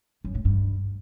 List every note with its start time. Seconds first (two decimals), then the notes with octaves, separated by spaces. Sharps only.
0.24 F#2
0.35 A2
0.45 G2